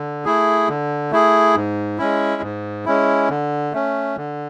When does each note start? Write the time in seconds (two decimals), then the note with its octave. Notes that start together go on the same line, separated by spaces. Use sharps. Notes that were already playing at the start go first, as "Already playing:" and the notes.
Already playing: D3
0.25 A3 E4 G#4
0.68 D3
1.11 A3 E4 G#4
1.55 G#2
1.98 G#3 C#4 E4
2.42 G#2
2.86 G#3 C#4 E4
3.30 D3
3.73 A3 C#4
4.17 D3